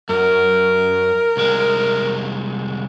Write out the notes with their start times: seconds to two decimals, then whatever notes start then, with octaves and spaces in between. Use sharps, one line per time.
0.09 F#2 A#4
1.37 C2 G#3